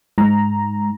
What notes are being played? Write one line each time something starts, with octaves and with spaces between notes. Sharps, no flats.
G#2 A#5